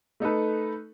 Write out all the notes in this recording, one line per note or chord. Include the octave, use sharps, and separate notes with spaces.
A3 D#4 A4 B4